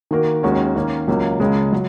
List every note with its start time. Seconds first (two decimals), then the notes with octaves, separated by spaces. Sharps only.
0.11 D#3 A#3 F#4 A#4
0.43 D#2 D#3 G#3 C#4 F#4
0.76 D#3 A#3 C#4
1.08 C#2 C#3 F#3 A#3
1.40 C#2 C#3 G#3
1.72 F#3